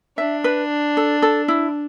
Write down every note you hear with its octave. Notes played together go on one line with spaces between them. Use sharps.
D4 E5
B4
A4
A4
E4